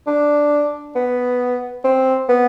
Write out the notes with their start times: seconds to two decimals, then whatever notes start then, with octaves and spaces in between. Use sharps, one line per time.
0.07 D4
0.95 B3
1.84 C4
2.29 B3